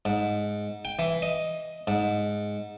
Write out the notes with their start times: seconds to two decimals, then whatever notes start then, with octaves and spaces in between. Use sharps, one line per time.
0.05 G#2
0.85 G5
0.99 E3
1.22 D#5
1.87 G#2